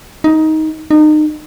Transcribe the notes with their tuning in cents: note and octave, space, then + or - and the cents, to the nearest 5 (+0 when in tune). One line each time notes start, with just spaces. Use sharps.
D#4 +15
D#4 -30